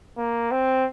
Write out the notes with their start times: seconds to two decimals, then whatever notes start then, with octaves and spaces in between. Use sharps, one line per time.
0.18 A#3
0.52 C4